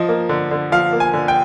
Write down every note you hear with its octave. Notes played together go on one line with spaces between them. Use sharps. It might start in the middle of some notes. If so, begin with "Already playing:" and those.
Already playing: F3 D#5
A#3
D3
D3
F3 F5
A#3
G#5
D3
G5